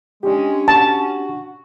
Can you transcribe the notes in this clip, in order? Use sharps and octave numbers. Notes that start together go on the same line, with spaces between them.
G#3 C#4 D4 G4
F#4 A5